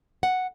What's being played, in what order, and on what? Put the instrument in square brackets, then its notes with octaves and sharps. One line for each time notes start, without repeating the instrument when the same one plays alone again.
[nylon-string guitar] F#5